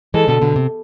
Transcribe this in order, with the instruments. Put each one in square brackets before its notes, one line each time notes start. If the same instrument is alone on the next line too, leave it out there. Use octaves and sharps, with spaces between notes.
[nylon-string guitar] E3 G#3 [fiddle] A4
[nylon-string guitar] B2 D3
B2 D3
C3